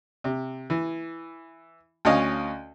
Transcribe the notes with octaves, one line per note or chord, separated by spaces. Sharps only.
C3
E3
D2 C#4 D#5 F5